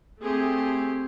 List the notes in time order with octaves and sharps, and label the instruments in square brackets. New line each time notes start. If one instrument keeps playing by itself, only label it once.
[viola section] A3 G#4 [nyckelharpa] C4 G4